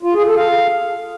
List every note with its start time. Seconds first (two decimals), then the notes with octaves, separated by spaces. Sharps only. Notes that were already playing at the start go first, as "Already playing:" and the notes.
0.03 F4
0.14 G#4
0.26 A4
0.37 F5